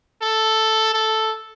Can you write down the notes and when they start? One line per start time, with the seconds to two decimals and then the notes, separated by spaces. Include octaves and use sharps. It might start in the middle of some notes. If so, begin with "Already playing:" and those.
0.22 A4
0.93 A4